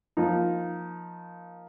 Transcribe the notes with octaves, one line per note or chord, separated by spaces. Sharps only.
F3 A#3 D#4